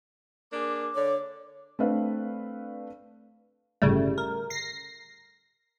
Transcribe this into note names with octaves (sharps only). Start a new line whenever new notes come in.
A#3 D4 G#4 D6
D3 C#5 D5
A3 C4 D4 B4 F5
G1 A2 C#3 G3 A3
A#4
A#6 C7